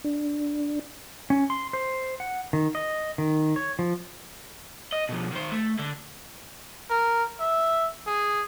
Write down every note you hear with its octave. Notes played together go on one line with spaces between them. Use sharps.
D4
C#4
C6
C5
F#5
D#3
D#5
D#3
C#5
F3
D#5
B2 F3
D#3 C5
A3
D3
A#4
E5
G#4